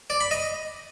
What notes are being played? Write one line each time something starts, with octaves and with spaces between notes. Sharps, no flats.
D5
B5
D#5